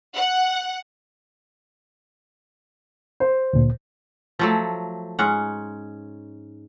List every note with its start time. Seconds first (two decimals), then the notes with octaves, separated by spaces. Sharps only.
0.16 F#5
3.20 C5
3.53 D2 A#2
4.39 F3 F#3 A3
5.19 G#2 C#4 F#5